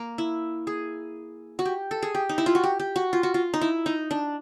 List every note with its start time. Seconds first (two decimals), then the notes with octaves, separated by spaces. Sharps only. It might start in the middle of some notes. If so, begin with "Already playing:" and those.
Already playing: A#3
0.18 E4
0.67 G#4
1.59 F#4
1.65 G4
1.91 A4
2.02 G#4
2.15 G4
2.29 D#4
2.38 E4
2.46 F4
2.55 F#4
2.64 G4
2.80 G4
2.96 F#4
3.13 F4
3.23 F#4
3.34 F4
3.54 D#4
3.61 E4
3.86 D#4
4.11 D4